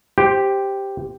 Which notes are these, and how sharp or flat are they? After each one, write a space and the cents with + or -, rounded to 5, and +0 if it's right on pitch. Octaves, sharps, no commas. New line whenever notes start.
G4 +0 C5 +0